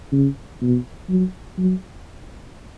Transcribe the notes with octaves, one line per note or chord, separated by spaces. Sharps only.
C#3
B2
F#3
F#3